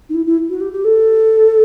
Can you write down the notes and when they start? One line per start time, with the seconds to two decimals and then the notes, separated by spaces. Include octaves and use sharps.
0.09 D#4
0.14 E4
0.26 E4
0.50 F#4
0.61 G4
0.73 G4
0.84 A4